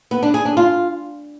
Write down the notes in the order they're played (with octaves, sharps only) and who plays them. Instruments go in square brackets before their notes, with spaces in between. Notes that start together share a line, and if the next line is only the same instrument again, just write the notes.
[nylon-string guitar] B3
D4
G#4
D4
F4